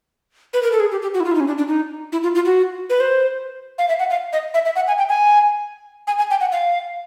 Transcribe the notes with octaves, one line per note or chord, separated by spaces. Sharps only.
B4
A#4
A4
G#4
G4
G4
F#4
E4
F4
E4
D#4
C#4
D4
D4
D#4
E4
F4
F4
F#4
B4
C5
F5
E5
F#5
F5
D#5
E5
E5
F#5
G#5
G5
G#5
G#5
G#5
G5
F#5
F5